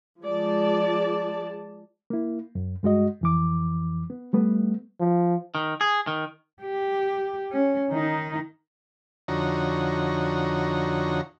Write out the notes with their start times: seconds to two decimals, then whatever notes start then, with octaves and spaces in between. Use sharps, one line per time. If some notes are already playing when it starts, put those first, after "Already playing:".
0.24 F3 G#3 G#4 D5 A5
2.10 A#3 E4
2.55 F#2
2.83 G2 G#3 F#4 D#5
3.21 F2 E3 D6
4.10 B3
4.33 G3 A3 B3
5.00 F3
5.55 D#3
5.81 G#4
6.07 D#3
6.62 G4
7.52 C#4
7.91 D#3 D#4
9.28 F2 D3 D#4 F#4 C#5 A#5